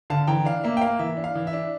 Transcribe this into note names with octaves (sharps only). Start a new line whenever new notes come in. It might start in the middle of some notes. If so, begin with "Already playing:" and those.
D3 F5 A5
E3 G5 A#5
D4 F5
A#3 E5
G5
A#3 F5
E3 E5
D4
F5
E3
E5
D4